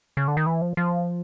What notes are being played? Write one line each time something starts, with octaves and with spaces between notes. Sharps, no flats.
C#3
D3
D#3
E3
F3
F3